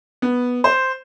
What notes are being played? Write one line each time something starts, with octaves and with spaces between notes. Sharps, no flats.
B3
C5